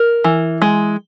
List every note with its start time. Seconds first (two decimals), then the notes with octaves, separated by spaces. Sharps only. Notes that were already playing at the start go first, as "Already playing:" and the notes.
Already playing: A#4
0.24 E3
0.62 G#3